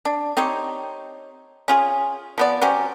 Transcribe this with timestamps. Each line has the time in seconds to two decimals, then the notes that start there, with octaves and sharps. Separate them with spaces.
0.05 D4
0.37 C4 D#4 G4 C#5
1.68 C#4 F4 G#4
2.38 F3 B3 D5
2.62 F#3 C#4 G4 C5